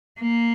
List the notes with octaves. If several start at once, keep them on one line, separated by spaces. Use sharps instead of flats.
A#3